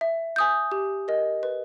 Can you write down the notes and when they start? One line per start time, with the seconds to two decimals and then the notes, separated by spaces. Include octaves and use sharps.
0.01 E5
0.36 G#5 D#6 G6
0.72 G4
1.08 A#4 D#5
1.43 B4